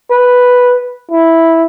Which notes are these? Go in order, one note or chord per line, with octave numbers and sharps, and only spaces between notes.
B4
E4